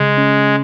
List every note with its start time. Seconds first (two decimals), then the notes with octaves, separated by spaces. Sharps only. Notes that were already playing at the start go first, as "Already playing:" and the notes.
Already playing: C#3 G#3
0.18 C#4